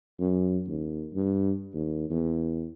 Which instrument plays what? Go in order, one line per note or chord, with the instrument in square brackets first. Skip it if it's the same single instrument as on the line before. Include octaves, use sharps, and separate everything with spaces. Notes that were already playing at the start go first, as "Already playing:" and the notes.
[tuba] F#2
D#2
G2
D#2
E2